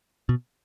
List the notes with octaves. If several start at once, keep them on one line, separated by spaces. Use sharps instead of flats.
B2